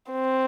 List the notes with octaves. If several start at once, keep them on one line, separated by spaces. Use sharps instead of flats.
C4